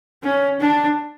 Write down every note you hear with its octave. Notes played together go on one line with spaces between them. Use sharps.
C#4
D4